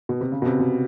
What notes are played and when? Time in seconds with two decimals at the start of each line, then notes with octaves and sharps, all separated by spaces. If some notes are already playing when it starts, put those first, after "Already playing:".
0.09 B2
0.21 C3
0.32 C#3
0.42 B2
0.46 C3
0.59 B2